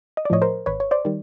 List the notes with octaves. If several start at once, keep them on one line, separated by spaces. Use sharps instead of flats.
D#5
D5
A2 F3 C#5 D#5
A#4 C5
G#1 B4 C#5
C#5
C5 D5
D#3 G3